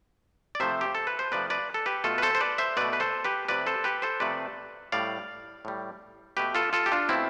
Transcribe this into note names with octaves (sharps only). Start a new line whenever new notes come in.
D5
C3 F3 A3 C5 E5
G4
A4
B4
C5
C3 F3 A3 B4 D5
B4 D5
A4
G4 B4
B2 A3 F4 A4
B4
A4 C5
C5
B4 D5
C5 E5
B2 A3 B4 D5
B4
A4 C5
G4 B4
C3 F3 A3 B4 D5
A4 C5
G4 B4
A4 C5
C3 F3 A3 B4 D5
A2 G3 D5 F5
A2 G3
B2 A3 G4 B4
F4 A4
F4 A4
G4
D4 F4
B2 A3 C4 E4